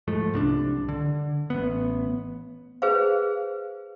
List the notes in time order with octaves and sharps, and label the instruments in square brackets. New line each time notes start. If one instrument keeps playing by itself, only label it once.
[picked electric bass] G#2 F3 A3
C2 C4 D4
D3
A1 B3
[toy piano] G#4 B4 C5 F5